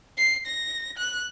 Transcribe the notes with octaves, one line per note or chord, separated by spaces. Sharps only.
C7
A#6
F#6